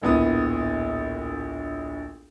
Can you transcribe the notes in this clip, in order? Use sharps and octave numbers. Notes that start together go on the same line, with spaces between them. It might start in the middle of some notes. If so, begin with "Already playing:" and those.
D1 A#1 B3 D#6